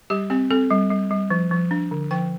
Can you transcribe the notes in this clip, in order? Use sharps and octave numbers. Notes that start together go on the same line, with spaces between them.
G3 G4
C4 G4
C4 A4
G3
G3
G3
F3
F3
D4
D3
F3 G5